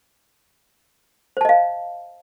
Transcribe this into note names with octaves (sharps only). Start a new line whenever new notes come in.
C5 D#5 F5 A5